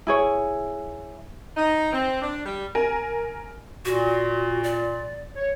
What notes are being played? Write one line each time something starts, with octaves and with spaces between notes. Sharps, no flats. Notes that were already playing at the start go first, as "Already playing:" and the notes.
E4 G#4 C#5
D#4
C4
D4
G3
A#4 G#5
A#2 F#4
D5
C#5